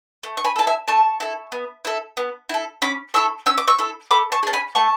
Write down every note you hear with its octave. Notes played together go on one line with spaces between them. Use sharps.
A3
C#6
G#5 B5
E4 A4 A5
E5 G#5
A3 A5 C#6
E4 A4
B3
E4 A4
B3
E4 A4
C#4 B5 D6
E4 A4 C#6 E6
C#4 E6
D6
C#6 E6
E4 A4
A3 B5 D6
A5 C#6
C#4 G#4 A5
G#5 B5
A3 A5 C#6